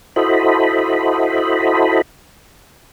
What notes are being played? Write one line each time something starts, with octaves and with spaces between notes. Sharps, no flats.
E4 F#4 A4 C5 D#5 B5